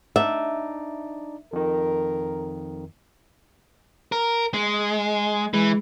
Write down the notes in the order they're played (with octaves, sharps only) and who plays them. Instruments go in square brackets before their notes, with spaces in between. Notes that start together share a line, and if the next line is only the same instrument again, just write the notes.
[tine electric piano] D4 D#4 D5 [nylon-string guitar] E5
[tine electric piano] F2 D#3 [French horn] A#4
[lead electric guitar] A#4
G#3
[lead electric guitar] E3 [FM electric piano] G#3